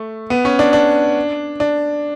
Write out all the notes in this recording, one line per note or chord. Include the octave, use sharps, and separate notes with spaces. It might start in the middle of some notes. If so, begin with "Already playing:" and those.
Already playing: A3
B3
C#4
D4
D4
D4